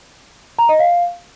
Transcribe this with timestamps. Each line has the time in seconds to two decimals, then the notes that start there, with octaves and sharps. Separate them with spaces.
0.59 A#5
0.69 D#5
0.79 F5